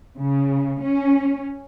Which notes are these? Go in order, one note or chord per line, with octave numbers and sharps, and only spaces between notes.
C#3
C#4